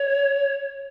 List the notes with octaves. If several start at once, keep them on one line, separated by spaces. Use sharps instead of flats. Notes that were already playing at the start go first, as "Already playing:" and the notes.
Already playing: C#5